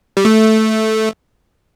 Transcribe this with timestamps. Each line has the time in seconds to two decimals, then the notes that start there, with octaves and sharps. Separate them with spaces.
0.17 G3
0.25 A3